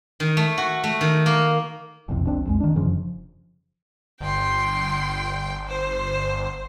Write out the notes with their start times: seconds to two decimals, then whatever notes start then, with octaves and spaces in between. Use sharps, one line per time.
0.20 D#3
0.37 A3
0.58 F#4
0.84 A3
1.01 D#3
1.26 A#3
2.08 F#1 B1 F2 C3
2.27 C#2 C4 D4
2.45 B1 F2 G#3
2.60 D#3 D4
2.74 F1 F#2 C#3 F3
4.20 G1 G5 C6
5.67 C5